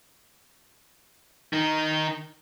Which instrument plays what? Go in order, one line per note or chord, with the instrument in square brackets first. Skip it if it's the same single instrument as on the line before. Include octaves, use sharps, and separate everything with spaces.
[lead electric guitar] D#3 D#4